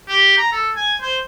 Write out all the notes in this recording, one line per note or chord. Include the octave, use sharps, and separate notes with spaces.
G4
A#5
A4
G#5
C5